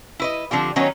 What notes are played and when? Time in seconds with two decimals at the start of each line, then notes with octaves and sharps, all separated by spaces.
0.20 E4 B4 D#5
0.51 D3 F3 C4 G4
0.76 D#3 F#3 B3 C#4 D#4